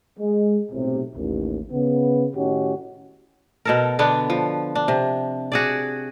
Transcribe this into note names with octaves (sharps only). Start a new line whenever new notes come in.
G#3
B1 A2 C3
A1 D#2
C#3 B3
A2 D#3 C#4 D#4 F#4 G4
B2 A4 A#4
D3 B3 D4
F3
D4
C3
F#4 G#4 D5